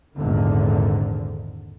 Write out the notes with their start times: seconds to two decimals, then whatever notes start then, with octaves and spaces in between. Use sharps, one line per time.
0.15 G#1 E2 A#2 D3 D#3